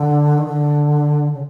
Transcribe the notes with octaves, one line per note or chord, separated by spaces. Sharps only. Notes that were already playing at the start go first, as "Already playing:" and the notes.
Already playing: D3
D#3
D3
C#3